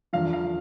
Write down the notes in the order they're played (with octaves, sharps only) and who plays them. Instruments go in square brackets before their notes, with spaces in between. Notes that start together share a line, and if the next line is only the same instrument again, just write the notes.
[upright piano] E2 D3 F3 F5
F5